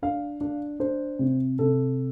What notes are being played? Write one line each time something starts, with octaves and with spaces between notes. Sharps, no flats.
D4 F5
D4
D4 C5
C3
C3 A4